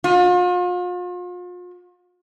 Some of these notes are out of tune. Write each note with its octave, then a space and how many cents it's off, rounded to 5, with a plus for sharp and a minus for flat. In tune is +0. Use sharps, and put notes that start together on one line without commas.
F4 +40